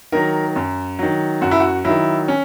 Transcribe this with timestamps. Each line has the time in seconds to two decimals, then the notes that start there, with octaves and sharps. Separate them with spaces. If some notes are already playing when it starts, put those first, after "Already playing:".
0.12 D#3 F#3 A#4
0.56 F#2
0.99 D#3 F#3
1.41 F#2 F#4
1.51 E4
1.60 F#4
1.84 D#3 F#3 E4
2.28 C#4